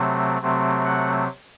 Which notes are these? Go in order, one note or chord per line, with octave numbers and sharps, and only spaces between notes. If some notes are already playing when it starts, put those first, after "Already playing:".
Already playing: C3 F#3 A3 C4
C3 F#3 A3 C4
F#5